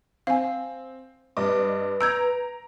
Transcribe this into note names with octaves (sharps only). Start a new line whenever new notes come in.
C4 F5 G#5
G2 B4 D#5 D6
A#5 E6 G6 G#6 D7